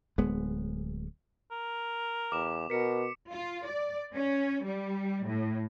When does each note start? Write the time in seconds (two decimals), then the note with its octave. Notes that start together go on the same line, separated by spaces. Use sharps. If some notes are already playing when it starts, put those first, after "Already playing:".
0.18 D1 G#3 B3
1.51 A#4
2.32 E2 D6 E7
2.70 B2 A#4 B6 C#7
3.32 F4
3.67 D5
4.16 C#4
4.65 G3
5.27 A2